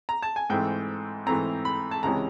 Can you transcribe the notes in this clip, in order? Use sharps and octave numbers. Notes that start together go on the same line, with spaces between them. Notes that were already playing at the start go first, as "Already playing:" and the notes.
A#5
A5
G#5
G#2 E3 A3 C4 G5
G#2 E3 A3 C4 A#5
B5
A5
C#2 C3 E3 G#3 C#4 A#5